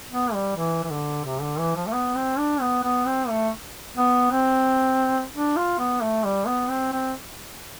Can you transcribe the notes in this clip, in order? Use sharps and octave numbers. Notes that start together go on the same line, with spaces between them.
B3
G3
E3
E3
D3
C3
D3
E3
F3
A3
B3
C4
D4
B3
B3
C4
A3
B3
C4
D4
F4
B3
A3
G3
B3
C4
C4